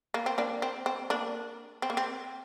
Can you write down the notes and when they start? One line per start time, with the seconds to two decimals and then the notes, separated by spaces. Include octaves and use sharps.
0.14 A#3
0.26 C4
0.38 A#3 D4
0.62 C4
0.86 C4
1.10 A#3 D4
1.82 C4
1.90 A#3
1.97 C4